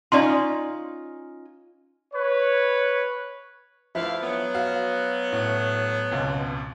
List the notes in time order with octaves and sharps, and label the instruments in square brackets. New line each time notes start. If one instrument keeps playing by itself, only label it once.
[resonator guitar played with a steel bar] C#4 D#4 F4 [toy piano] D5 C6
[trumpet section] B4 C#5
[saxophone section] D2 B4 F5 [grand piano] F3 E4
[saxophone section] F#3 B3
[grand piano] F#4 F5
A2
G#1 C#2 B2